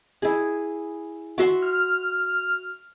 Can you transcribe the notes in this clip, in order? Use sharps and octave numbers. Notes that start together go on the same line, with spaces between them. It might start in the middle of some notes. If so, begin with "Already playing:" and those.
E4 G#4
F#4 E5 C6
F6